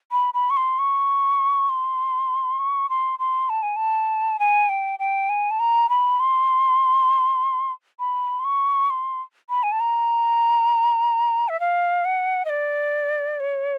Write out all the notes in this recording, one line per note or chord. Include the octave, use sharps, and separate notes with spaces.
B5
B5
C#6
C6
C#6
C6
C#6
C6
C6
A5
G#5
A5
G#5
G5
G5
G#5
A5
A#5
B5
C6
B5
C6
C#6
C6
B5
G#5
A5
A#5
E5
F5
F#5
D#5
D5
C#5